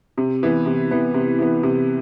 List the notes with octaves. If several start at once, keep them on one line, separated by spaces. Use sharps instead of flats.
C3
E3 B3
C3
E3 B3
C3
E3 B3
C3